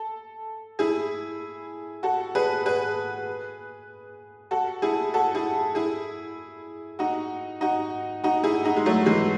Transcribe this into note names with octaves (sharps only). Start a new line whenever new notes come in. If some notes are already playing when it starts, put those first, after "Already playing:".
Already playing: A4
E4 G#4
F#4 A4
G#4 B4
G#4 B4
F#4 A4
E4 G#4
F#4 A4
E4 G#4
E4 G#4
D#4 F#4
D#4 F#4
D#4 F#4
E4 G#4
D#4 F#4
G#3
F#3 A3
E3 G#3